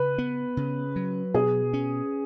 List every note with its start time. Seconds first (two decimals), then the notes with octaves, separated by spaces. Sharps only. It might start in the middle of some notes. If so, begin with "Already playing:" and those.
Already playing: C#3 B4
0.18 B3
0.57 C#3
0.96 F#3
1.34 B2 G#4
1.73 C#4